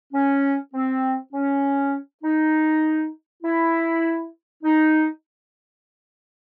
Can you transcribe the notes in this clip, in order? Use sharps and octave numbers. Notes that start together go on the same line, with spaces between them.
C#4
C4
C#4
D#4
E4
D#4